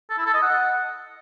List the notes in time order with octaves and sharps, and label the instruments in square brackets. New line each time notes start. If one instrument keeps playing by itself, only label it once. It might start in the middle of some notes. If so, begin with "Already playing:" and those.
[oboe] A4
E4
A4
D#5
F#5